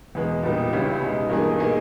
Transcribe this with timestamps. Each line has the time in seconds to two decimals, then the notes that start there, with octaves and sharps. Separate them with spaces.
0.15 E2 B2 G#3 B3
0.43 A#2 G3 B3 D#4
0.72 C#2 C#3 G3 C#4 E4
1.01 B2 G#3 D#4
1.29 G2 E3 A#3 D#4 G#4
1.58 B2 A#3 D#4 G#4